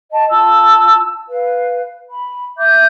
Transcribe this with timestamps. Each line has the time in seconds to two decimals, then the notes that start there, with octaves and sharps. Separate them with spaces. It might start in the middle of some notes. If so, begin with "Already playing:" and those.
0.11 D#5 A5
0.30 F4 A5 E6
1.29 B4 F5
2.10 B5
2.58 E5 D6 G6